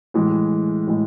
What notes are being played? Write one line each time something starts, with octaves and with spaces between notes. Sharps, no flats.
A2 E3 G#3
A2 E3 G#3